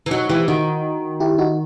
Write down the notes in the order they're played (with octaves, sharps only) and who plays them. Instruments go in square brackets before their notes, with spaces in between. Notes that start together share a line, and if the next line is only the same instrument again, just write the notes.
[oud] E3
[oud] F#3 [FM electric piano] D#4 F#4
[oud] E3 [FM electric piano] E4 G4
[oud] D#3 [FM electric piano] D#4 F#4
[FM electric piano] E4 G4
D#4 F#4